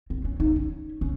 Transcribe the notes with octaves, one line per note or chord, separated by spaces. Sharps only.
C4
C#4
D#4
C#4
C#4